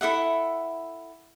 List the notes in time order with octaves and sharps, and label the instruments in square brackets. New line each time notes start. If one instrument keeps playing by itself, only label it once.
[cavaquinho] E4 A4 E5 F#5